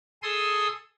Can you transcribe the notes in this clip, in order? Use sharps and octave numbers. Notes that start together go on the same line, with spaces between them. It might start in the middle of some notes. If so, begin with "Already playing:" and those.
G#4 A4 C6 D#6 E6